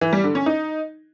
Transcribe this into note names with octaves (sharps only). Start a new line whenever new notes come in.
E3
G3
D3
C#4
D#4